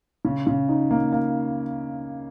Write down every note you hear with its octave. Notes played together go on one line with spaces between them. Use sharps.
C#3
C#3
D#4
A#3
A#3